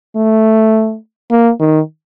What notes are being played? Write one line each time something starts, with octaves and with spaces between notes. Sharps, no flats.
A3
A#3
D#3